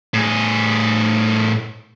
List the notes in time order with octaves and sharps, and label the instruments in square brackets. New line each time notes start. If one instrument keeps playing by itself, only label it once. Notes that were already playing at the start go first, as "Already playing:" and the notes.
[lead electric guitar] A2 G#4